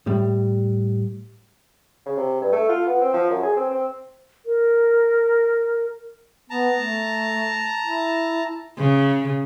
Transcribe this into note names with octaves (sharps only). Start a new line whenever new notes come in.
A2 G3
C#3
C3
G2
A3
F4
B3
C4
F3
F#2
G#4
C4
C4
A#4
B3 A5 A#5
A3
E4
C#3